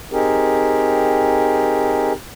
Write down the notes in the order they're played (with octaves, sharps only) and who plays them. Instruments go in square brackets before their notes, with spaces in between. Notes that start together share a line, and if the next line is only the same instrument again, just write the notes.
[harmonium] C4 D#4 G4 G#4 A#4